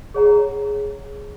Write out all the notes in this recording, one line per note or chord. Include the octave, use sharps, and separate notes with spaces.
G#4 C#5 F#5 A#5